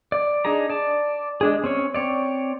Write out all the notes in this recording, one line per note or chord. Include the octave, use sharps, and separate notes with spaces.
D5
D4 D#4 G#4 A#5
D5 A5
G#3 D4 G#4
C4 C#4 C#5
C4 C#5 D5